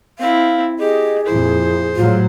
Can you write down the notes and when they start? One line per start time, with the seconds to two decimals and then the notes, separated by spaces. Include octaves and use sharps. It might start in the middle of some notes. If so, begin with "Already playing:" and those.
0.19 C4 E4 F5
0.79 G4 G#4 D#5
1.26 F2 A#2 E4 C5
1.96 A2 F#3 F4